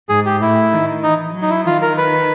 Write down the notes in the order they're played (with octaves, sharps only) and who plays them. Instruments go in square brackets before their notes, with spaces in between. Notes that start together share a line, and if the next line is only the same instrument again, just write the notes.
[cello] G#2 [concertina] G#4
[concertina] G4
[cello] A2 [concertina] E4
[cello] D#3
[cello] E3 [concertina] D#4
[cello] F#3
[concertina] D#4
E4
[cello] D#3 [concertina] F4
[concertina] A#4
B4